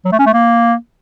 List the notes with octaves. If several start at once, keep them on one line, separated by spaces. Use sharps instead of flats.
F#3
A3
C#4
A3
A#3